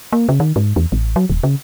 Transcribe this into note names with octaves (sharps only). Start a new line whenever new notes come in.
A#3
C#3
D#3
G#2
E2
A1
F#3
D#1
C#3